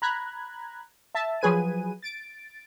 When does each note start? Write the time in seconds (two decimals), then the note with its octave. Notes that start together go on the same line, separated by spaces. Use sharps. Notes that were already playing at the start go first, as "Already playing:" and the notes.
0.02 A#5 B5 F#6 G#6
1.15 E5 A5
1.41 F3 F#3 G#4 B4 G#5 D#7
2.03 A6 D7